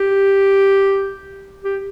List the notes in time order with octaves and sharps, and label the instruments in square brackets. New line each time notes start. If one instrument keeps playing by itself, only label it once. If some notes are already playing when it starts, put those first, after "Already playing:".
Already playing: [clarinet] G4
G4